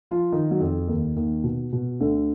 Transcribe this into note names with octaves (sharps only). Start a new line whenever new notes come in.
F3 F4
D#3 D#4
F#3
F2 F3
D#2 D#3
D#2 D#3
B2
B2
D2 D3